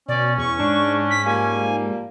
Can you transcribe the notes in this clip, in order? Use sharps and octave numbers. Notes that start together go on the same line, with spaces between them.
B2 C#4 D5
E2 C#6
G#2 D4
B6
F3 G3 A#3 G#5